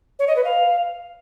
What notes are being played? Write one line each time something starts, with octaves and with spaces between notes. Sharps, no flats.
C#5
D#5
B4
F5